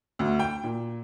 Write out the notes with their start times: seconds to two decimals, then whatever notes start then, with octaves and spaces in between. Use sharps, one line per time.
0.19 D2
0.39 G5
0.63 A#2